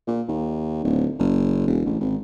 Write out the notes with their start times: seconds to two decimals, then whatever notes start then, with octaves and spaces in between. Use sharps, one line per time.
0.08 A#2
0.28 D#2
0.85 D1
1.19 F#1
1.67 E1
1.86 A1
2.01 G#1